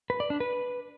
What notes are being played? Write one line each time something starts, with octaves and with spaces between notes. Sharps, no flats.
B4
D5
D4
B4